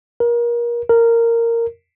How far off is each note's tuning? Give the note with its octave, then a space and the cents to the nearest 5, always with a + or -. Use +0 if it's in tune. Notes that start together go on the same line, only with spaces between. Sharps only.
A#4 +30
A#4 -10